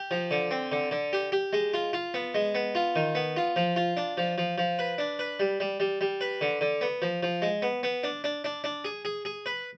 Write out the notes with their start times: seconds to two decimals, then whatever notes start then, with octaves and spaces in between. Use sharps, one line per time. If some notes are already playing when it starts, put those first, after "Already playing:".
Already playing: G4
0.11 F3
0.31 D3
0.51 C4
0.72 D3
0.91 D3
1.13 G4
1.32 G4
1.53 G#3
1.74 F4
1.93 F4
2.14 B3
2.34 G#3
2.55 B3
2.75 F4
2.96 D#3
3.15 B3
3.37 F4
3.56 F3
3.76 F4
3.97 D4
4.17 F3
4.38 F3
4.58 F3
4.79 B4
4.98 D4
5.19 B4
5.40 G3
5.60 G3
5.80 G3
6.01 G3
6.21 B4
6.41 D3
6.61 D3
6.81 B3
7.02 F3
7.23 F3
7.42 G#3
7.62 B3
7.83 B3
8.03 D4
8.24 D4
8.44 D4
8.64 D4
8.85 G#4
9.05 G#4
9.25 G#4
9.46 B4